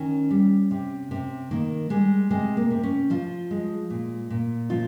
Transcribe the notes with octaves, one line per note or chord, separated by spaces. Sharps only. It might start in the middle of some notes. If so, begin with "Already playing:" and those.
Already playing: D#3 C#4
G3
C3
C3
D#3 A#3
G3 G#3
C3 G#3
A#3
C3
C#4
F3 F4
G#3
A#2
A#2
F3 F4